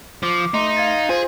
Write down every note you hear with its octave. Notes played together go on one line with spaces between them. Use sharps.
F3 D6
A3 D#4 C6
F5 G#6 A6
F4 G#4 C5 G#5